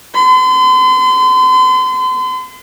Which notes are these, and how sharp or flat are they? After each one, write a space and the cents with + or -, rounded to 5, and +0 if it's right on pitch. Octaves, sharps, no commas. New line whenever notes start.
C6 -40